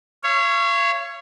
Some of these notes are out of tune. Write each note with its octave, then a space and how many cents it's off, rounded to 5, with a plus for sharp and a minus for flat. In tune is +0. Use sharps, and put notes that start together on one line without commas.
C#5 +0 F5 -40